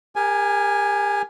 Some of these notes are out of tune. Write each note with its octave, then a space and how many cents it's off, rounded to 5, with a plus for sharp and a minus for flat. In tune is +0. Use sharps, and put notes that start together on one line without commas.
G4 +40 A#4 +0 G#5 +0